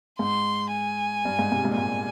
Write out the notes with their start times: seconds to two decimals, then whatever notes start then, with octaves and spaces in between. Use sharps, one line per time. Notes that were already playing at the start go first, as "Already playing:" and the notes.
0.19 G#2 C6
0.72 G#5
1.25 G2
1.39 G#2
1.52 G#2 C3
1.64 G#2 C3
1.71 A#2
1.78 G#2 G#5